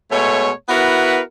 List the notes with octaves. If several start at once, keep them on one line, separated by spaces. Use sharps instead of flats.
B2 G#3 A3 C#5
B3 E4 F#4 A#4 B4